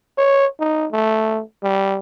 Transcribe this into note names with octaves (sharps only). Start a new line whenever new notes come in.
C#5
D#4
A3
G3